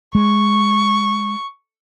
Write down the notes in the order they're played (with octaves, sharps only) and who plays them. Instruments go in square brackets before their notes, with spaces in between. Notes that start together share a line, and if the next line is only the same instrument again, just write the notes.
[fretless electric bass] G#3 [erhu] C#6